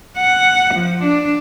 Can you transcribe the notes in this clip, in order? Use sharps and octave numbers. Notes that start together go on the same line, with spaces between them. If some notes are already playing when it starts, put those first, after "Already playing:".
F#5
F3
D4